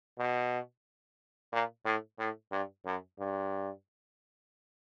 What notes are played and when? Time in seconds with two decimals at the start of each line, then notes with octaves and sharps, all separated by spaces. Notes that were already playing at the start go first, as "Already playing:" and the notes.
0.19 B2
1.52 A#2
1.86 A2
2.19 A2
2.52 G2
2.86 F#2
3.19 G2